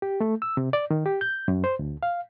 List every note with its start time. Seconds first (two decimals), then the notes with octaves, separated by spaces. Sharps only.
0.02 G4
0.20 A3
0.42 E6
0.57 C3
0.73 D5
0.91 D#3
1.06 G4
1.21 G6
1.48 F#2
1.64 C5
1.79 D2
2.03 F5